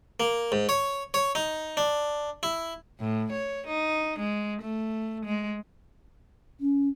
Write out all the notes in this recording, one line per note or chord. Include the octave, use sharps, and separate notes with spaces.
A#3
G#2
C#5
C#5
D#4
D4
E4
A2
C#5
D#4
G#3
A3
G#3
C#4